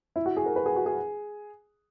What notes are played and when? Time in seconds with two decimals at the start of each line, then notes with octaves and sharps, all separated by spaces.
0.16 E4
0.26 F#4
0.37 G#4
0.46 A#4
0.56 B4
0.66 G#4
0.76 F#4
0.86 G#4